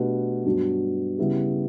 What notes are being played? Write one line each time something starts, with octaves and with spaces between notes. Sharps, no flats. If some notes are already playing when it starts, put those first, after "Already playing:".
Already playing: B2 A3 D4 G4 B4
G2 F#3 B3 D4 F#4
C#3 G3 B3 E4 G4